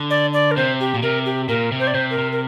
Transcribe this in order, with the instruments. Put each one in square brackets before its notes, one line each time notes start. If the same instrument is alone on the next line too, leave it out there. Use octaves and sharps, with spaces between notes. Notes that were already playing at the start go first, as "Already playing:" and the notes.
Already playing: [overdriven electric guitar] D3
[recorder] D5
D5
A#4
[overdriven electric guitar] C3 [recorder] C5
[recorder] G4
[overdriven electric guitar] A#2
[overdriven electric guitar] C3 [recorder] A#4
[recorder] G4
[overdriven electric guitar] A#2 [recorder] A#4
[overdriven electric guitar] C3
[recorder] C5
D5
[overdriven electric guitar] C3 [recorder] C5
[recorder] A#4
[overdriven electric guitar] C3
[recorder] A#4